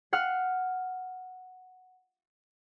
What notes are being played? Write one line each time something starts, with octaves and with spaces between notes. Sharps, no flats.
F5 F#5 F6